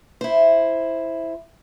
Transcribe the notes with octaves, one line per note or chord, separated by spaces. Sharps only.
E4 C5